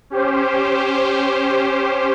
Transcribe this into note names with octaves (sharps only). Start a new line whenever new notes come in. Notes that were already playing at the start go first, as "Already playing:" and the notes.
C#4 G4 C5